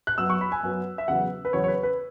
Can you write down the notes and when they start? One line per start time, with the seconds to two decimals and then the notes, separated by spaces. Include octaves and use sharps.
0.07 F#6
0.18 F#2 F#3 B3 E6
0.30 C#6
0.41 B5
0.52 G#5
0.63 F#2 F#3 B3
0.98 E5
1.08 E2 C#3 F#3 B3 F#5
1.45 B4
1.53 E2 C#3 F#3 B3 C#5
1.64 C#5
1.68 B4
1.83 B4